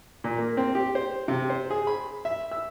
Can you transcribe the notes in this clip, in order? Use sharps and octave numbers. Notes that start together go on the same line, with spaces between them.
A#2
A#3
C4
G4
C5
C3
C5
G#4
B5
E5
E6